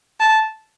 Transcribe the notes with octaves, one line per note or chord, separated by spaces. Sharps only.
A5